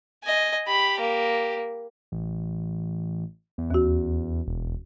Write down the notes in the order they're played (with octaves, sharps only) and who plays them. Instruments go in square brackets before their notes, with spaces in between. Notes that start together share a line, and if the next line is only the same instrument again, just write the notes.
[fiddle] D#5 G#5
[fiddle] G4 [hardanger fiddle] B5
[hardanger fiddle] A#3
[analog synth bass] A1
E2
[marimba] D#2 F#4
[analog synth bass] E1